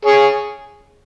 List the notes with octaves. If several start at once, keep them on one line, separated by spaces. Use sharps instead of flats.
G#4 C#5